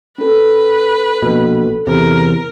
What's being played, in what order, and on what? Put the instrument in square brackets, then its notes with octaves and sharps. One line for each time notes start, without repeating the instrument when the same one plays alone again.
[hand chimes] C#4 A4 [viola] B4
[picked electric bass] A#1 B2
[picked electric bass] E2 C3 [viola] A#4